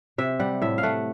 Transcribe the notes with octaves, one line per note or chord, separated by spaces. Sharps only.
C3 E5
G3 F#5
A2 E5
F5
A3 F#5